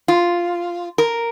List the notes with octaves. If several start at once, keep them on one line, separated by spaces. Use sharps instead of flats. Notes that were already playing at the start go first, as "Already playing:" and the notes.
F4
A#4